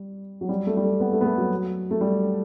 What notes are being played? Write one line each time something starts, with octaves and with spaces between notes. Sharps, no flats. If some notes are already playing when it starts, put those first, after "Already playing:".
Already playing: G3
F#3
G3
A3
G3
A3
B3
A3
B3
A3
F#3
A3
G3